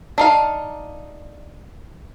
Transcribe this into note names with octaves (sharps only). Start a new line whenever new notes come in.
D4 D#4 F5